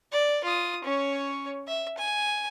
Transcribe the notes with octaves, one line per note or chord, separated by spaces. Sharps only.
D5
F4 D#6
C#4 C#5
E5
G#5